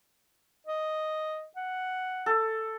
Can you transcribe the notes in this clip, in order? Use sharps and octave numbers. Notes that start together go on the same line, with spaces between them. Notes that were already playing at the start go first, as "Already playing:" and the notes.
D#5
F#5
A4